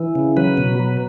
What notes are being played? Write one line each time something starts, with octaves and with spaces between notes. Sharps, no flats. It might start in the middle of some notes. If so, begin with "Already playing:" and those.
Already playing: E3
C#3
F#3 B4
B2
F#3